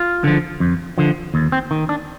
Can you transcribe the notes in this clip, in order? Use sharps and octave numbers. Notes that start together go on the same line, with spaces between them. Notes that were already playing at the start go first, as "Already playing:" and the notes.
Already playing: F4
D3 F3
F2
D3 F3
D#2
C4
D#3
D4